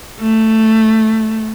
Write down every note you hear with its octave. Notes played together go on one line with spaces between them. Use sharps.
A3